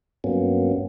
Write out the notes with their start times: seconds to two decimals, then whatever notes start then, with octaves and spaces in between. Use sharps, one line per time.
0.24 G2 F#3 A#3 B3 C#4